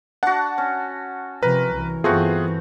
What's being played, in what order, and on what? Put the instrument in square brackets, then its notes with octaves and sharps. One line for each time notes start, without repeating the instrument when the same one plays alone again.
[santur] D4 F#4 [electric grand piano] F#5 A5
[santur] C#4
[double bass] C3 F3 [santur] A#4 [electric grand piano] B4
[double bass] C2 E3
[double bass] G2 E3 [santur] A3 C4 F#4 [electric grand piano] B3 F4 G#4